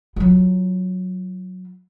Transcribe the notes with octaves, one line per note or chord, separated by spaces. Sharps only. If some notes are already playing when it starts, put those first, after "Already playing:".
F#3 F4